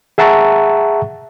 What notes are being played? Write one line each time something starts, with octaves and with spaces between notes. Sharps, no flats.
G#4 E5 F#5 A5 A#5 C#6